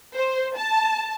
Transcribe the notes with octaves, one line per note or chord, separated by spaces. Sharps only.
C5
A5